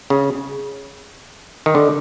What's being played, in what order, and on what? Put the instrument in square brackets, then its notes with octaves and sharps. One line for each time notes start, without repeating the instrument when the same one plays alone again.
[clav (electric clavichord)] C#3
D#3
D3